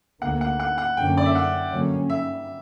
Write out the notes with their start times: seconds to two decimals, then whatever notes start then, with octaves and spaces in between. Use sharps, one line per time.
0.22 D2 D3 A#3 F#5
0.41 F#5
0.60 F#5
0.78 F#5
0.97 F#2 D3 A#3 C#4 G5
1.17 D5
1.26 E5
1.35 F#5
1.73 G2 D3 F#3 A#3 C#4
2.10 E5